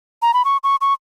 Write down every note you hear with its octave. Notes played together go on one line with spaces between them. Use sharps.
A#5
B5
C#6
C#6
C#6